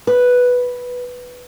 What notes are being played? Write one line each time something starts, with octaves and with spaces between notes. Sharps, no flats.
B4